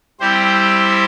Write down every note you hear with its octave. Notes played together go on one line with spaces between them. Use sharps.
G3 C4 E4 G4 C5